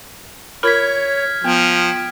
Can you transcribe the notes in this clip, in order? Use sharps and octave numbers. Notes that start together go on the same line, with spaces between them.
F4 A#4 C#5 B5 F6 G#6 B6
F3 B3 G5